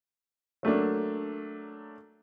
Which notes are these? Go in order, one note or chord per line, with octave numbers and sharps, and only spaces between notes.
F#3 A3 A#3 D4